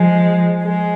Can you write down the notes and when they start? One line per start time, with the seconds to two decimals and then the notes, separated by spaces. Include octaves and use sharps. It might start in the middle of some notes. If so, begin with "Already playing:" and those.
Already playing: F3 G#3
0.61 F3 G#3